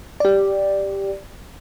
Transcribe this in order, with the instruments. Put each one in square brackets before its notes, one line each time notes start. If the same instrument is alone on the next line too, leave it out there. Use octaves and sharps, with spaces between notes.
[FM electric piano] G4 D5